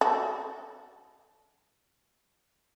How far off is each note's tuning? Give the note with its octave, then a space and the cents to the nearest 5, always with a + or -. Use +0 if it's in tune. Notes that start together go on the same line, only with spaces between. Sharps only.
D4 -40 F#4 +20 A4 +5